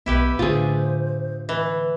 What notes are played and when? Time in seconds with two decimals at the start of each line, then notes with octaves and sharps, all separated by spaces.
0.06 B1 B3 E4 G4 B4
0.39 A2 D3 F4 G#4 C5
1.49 E3